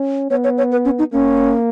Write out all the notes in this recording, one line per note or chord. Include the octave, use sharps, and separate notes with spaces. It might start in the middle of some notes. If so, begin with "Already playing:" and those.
Already playing: C#4
B3 C#5
C#5
C#5
B4
C#4
D#4
A#3 C#4